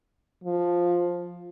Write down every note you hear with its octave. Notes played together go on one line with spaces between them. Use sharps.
F3